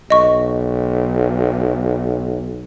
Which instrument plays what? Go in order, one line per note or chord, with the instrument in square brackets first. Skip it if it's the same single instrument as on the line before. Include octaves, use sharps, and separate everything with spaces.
[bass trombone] B1 [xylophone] D#5 C#6